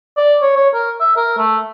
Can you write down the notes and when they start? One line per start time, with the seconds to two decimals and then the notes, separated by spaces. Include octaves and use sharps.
0.17 D5
0.42 C#5
0.56 C#5
0.74 A#4
1.00 E5
1.16 A#4
1.38 A3